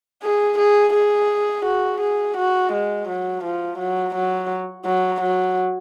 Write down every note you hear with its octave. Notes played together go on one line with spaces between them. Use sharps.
G#4
G#4
G#4
F#4
G#4
F#4
G#3
F#3
F3
F#3
F#3
F#3
F#3